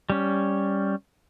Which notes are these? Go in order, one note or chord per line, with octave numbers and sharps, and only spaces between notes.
G3 C#4